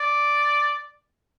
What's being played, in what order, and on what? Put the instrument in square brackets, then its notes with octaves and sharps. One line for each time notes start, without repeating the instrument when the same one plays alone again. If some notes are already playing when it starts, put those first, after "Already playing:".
Already playing: [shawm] D5